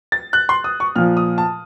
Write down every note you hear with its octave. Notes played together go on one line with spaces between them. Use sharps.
A6
F#6
C6
D#6
C#6
A#2 F3 F6
D#6
A5